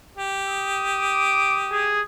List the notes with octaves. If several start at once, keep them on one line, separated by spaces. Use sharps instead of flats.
G4
D#6
D6
G#4